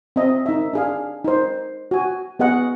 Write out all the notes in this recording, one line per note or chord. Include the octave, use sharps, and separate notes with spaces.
C4 D#5 E5
D#4 E5
D4 G#4 F5
D#4 C5
F#4 G#5
B3 G#4 D#5 F#5